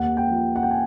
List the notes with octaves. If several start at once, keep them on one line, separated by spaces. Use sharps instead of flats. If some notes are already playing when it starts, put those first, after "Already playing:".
Already playing: D#2 F#5
G5
F3
F#5
G5
G#5